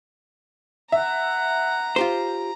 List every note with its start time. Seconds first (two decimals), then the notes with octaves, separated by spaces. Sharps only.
0.92 E5 F#5 A#5
1.96 F4 G4 C5